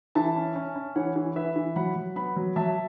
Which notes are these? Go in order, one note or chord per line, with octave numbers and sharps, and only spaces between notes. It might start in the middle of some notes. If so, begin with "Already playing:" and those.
E3 E5 A5
C#4
C#4
C#4
E3 C#5 F#5
E3
E3 B4 E5
E3
F#3 F#5 B5
F#3
B3 F#5 B5
F#3
F#3 E5 A5